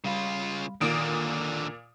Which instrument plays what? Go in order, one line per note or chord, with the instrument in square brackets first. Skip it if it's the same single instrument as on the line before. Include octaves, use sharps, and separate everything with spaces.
[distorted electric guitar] C#3 F4 [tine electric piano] G3 F5 B5
[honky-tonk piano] A#2 D#6 D7 [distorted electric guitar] D3 A#3 [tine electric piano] D#3